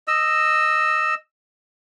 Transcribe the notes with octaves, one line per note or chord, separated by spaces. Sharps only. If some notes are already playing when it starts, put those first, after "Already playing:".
D#5 E6